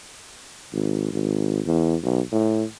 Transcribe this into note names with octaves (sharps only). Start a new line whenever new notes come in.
G#1
G#1
E2
B1
A2